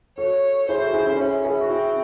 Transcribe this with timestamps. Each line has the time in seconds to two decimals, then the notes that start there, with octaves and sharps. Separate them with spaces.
0.18 F#4 A4 C#5
0.69 E4 G#4 C5
0.81 F#4 A4
0.94 E4 G#4
1.07 C#4 E4
1.19 C#4 E4 G#4
1.45 E4 G#4
1.61 F#4
1.70 C4 E4 G#4